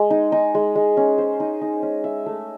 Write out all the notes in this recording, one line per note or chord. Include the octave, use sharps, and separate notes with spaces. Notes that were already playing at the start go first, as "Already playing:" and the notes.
Already playing: G#3
D#4
D#4
G#3
G#3
C#4
C5
D#4
D#4
C#4
E5
A3